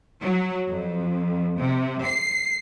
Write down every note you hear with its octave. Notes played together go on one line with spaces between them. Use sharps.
F#3
F2
C3
C7